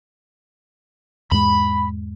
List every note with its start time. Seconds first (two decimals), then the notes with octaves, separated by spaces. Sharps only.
1.31 E2 G#2 G#3 B5